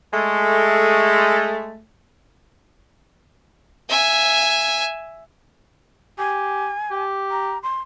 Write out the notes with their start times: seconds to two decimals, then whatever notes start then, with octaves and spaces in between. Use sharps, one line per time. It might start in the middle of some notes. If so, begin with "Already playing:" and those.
0.13 G#3 A3
3.89 E5 G#5
6.18 G4 G#5
6.91 G4
7.31 A#5
7.63 C6